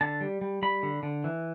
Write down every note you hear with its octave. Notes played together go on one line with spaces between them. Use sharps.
D3 A5
G3
G3
G3 B5
D3
D3
E3